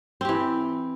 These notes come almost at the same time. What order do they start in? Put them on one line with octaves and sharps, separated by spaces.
C4 G4 E3